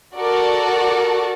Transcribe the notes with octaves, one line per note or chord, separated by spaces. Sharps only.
F#4 A4 A#4 D5